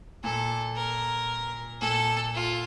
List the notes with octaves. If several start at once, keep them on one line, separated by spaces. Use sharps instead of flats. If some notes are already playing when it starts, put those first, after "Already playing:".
A#2 A4
A#4
A#2 A4
F4